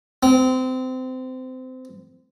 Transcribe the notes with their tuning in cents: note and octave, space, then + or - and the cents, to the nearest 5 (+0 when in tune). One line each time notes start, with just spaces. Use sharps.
C4 -25